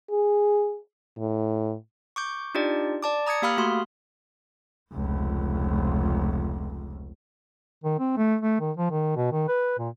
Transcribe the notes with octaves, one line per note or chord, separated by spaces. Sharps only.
G#4
A2
C#6 D6 G6
D4 D#4 F4 G4 D5
D5 A5 D6
A#5 D#6 G#6 C#7
A#3 G4 F5 B5 D#6 F6
A3 F#4 C6
F1 C#2
D#3
C4
A3
A3
D#3
F3
D#3
B2
D#3
B4
A#2